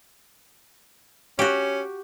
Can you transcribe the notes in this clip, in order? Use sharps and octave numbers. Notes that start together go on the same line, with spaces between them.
C#4 F#4 G4